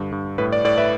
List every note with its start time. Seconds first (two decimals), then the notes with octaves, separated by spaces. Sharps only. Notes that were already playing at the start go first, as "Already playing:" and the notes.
Already playing: G2 D3
0.12 G2
0.38 A2 B4
0.53 D5
0.65 A2 D5
0.78 B4 E5